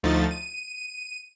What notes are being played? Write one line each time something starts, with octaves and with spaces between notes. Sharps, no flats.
D2 F3 A3 D#4 A6
D#7